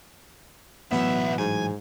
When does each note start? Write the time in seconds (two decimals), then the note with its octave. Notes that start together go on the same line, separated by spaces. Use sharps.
0.92 B1 A2 E3 F#3 B3 E5
1.38 G#2 G#5